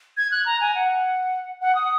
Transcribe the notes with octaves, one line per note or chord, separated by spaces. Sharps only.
G#6
F#6
A#5
G#5
F#5
F#5
D#6